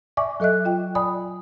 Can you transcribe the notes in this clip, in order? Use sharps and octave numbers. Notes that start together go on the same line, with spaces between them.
D5 E5 G#5 C#6 D6
F#3 A4 D#5 E5 F#6
F4 G5
D5 G#5 B5 D#6